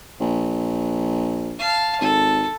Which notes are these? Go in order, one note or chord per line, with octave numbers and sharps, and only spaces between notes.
A#1
F5 A5
G#1 A4